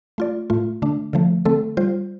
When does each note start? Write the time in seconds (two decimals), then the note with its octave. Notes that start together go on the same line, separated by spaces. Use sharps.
0.18 A3 F4 D5
0.50 A2 A3 F4
0.82 D3 A3 D4
1.13 D3 F3 A3
1.45 D3 A3 C4 A4
1.77 G3 F4 C5